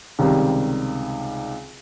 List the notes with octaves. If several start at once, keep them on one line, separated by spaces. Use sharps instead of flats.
C#2 C3 D#3 G3